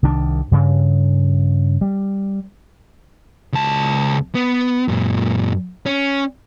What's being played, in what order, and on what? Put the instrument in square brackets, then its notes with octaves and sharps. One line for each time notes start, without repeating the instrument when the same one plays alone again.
[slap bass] C2 D#3 D4
G2 C#3
G3
[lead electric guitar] C#2 A5
B3
F#2 A#2
C#4